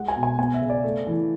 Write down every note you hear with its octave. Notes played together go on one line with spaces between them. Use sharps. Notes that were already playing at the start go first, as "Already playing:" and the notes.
Already playing: G#3 F#5
G#5
B2
G#5
B3 G#5
E5
C#3
D5
A3
E3